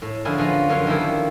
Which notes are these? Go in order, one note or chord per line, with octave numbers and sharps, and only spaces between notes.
A2
D3 F3 C#4 E4 G#4
F3 B3 F4 A#5
F#2 D3 B3 F4 C#5 F5
D#3 F3 G3 A#3 E4 A4